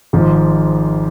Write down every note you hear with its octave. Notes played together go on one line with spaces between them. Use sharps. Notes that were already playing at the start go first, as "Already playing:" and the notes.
G#1 G#2 F3